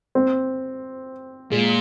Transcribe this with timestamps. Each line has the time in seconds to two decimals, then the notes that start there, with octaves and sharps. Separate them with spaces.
0.15 C4
1.52 A#2 G#3